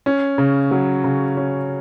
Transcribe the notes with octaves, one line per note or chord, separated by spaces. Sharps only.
C#4
C#3
F#3
C#3
C#4